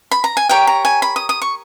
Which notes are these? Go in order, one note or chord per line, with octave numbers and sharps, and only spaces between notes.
B5
A#5
G#5
G4 A#4 C#5 G5
A#5
G#5
B5
D#6
D#6
C#6